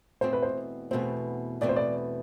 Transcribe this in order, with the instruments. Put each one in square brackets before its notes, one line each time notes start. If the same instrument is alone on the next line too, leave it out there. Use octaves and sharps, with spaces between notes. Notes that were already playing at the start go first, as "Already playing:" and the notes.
[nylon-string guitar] E2 B2 A3 C4 [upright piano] C5
[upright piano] B4
C5
[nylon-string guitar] E2 B2 A3 C4 [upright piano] C5
[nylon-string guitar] E2 B2 A3 C4 [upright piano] D5
[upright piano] C5
D5